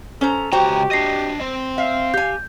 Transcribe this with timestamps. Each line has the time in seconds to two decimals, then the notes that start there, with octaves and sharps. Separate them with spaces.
0.21 C#4 A4 C5 A#5
0.52 C#2 F#4 G4 C5 G5 A#5
0.91 D4 D#5 A#6 C7
1.41 C4
1.78 E5 F5
2.14 G4 G#5 G6